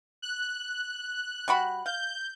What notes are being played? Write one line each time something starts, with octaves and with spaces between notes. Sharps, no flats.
F#6
G3 F#4 B5
F5 G6